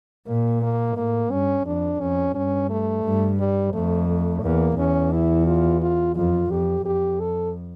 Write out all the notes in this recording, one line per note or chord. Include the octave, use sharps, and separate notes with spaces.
A#2 A#3
A#3
A2 A#3
G2 C#4
F2 D4
F2 C#4
G2 C#4
A3
G2
G3
F2 A3
A3
E2 A#3
E2 C#4
E4
F4
F4
F2 F4
F2 G4
F2 G4
A4